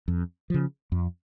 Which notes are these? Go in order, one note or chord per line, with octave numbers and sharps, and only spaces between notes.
F2
C#3 F3
F2